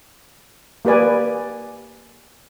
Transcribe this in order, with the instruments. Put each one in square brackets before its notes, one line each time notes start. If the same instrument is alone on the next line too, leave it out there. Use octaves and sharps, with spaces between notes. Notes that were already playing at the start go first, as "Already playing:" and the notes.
[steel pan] A#3 G4 B4 D5 G#5